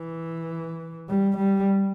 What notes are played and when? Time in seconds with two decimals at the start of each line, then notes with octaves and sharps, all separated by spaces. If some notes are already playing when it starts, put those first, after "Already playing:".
Already playing: E3
1.09 G3
1.37 G3